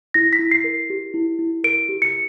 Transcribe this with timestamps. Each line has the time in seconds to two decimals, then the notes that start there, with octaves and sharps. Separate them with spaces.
0.14 E4 A#6
0.33 B6
0.39 E4
0.51 C7
0.64 A#4
0.90 G4
1.14 E4
1.39 E4
1.64 A#4 D7
1.89 G4
2.02 C#7